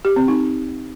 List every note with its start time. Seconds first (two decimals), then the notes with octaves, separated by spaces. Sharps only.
0.05 G4
0.16 C4
0.28 D#4